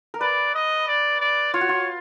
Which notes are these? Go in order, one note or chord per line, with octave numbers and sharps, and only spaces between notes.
A#4
B4 D5
D#5
D5
D5
F4 C#5
F#4
F4